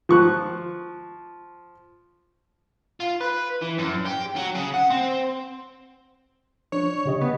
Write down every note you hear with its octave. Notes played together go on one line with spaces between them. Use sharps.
F3 C#6 F#6
F4
B4
E3
F#2
G4
F#3
C#3
F#5
C4
F3 D4 C#5
C#3 G4 D#5
B3